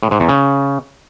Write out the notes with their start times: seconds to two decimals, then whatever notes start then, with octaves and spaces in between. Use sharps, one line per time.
0.03 A2
0.11 G#2
0.20 E2
0.29 C#3